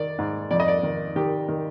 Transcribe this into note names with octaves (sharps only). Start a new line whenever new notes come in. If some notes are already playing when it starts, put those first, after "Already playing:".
Already playing: D#3 D5
G#2
F2 D5
D#5
D5
D#3
D#3 G4
D#3